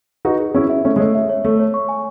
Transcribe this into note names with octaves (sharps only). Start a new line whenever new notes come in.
D#4 F#4 B4
G#4
C#4 E4 G#4
E5
A3 C#4 C#5
G#3
A3 C#5
E5
C#5
A3 C#5
C#5
C#6
G#5